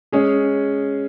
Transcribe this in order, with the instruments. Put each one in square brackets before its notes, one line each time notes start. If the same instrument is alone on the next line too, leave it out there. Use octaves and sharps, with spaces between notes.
[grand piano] G#3 C#4 G#4